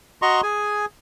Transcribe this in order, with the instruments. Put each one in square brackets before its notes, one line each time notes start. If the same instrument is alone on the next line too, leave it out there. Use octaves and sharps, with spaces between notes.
[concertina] F#4 D#5 A#5 C6 C#6
G#4 G#5